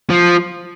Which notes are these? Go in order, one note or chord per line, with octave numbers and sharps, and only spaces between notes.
F3